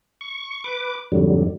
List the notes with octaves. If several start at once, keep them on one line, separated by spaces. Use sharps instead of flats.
C#6
B4 D6
F2 G#2 D3 F#3 G3